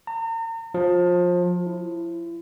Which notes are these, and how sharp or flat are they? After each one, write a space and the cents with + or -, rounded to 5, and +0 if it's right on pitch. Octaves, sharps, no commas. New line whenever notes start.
A#5 -40
F3 +25
E4 +35